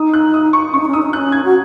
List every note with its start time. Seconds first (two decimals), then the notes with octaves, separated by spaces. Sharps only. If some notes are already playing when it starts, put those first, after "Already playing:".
Already playing: D#4 D#6
0.13 F#6
0.34 D#6
0.53 C#6
0.73 C#4 C#6
0.80 D#4
0.88 C#4
0.93 D#4 D#6
1.02 C#4
1.10 D#4
1.13 C#4 F#6
1.32 G#6
1.45 F#4